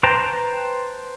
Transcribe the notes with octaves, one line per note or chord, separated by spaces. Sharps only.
B4 C5 G5 A5 A#5